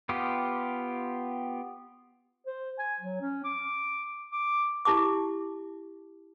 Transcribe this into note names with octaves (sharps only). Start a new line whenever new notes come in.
B3 F4 G4
C5
G#5
F#3
C#4
D6
D6
E4 G4 A5 D6